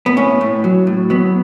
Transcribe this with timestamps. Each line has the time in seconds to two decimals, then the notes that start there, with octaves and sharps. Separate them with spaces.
0.06 B3
0.17 A2 C#4
0.41 A2
0.64 F#3
0.87 A2
1.10 F#3 B3